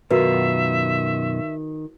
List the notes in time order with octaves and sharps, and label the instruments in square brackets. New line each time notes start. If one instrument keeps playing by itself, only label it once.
[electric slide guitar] F#2 B2 F4 [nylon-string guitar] D#3 [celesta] F#4 B4 [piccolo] E5